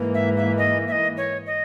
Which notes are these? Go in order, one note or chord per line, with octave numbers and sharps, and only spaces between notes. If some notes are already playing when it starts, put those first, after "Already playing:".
Already playing: G#2 E3 A#3
E5
E5
D#5
E5
D#5
C#5
D#5